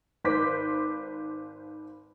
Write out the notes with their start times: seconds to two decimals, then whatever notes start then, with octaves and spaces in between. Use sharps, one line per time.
0.24 G#1 B4 C5 C6 D6 B6